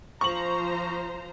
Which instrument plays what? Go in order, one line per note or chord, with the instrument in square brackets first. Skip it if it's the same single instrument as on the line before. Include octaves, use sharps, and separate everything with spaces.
[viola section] F3 C5 A#5 [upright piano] C#6 F#7